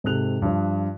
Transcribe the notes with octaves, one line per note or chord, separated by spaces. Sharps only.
G#2 C3 A4 F#6 F7
G2 F3